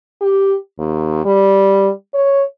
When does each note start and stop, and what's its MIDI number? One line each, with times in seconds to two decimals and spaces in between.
0.21 0.56 67
0.79 1.21 39
1.25 1.91 55
2.14 2.43 73